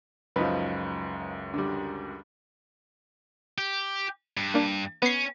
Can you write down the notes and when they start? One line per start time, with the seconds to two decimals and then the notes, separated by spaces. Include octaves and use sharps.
0.36 C#2 F#2 F3 D#4 B4
1.54 D3 G3
3.58 G4
4.37 G2
4.54 A#3 D4
5.02 B3 C#4 C7